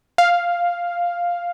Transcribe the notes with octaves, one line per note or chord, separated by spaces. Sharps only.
F5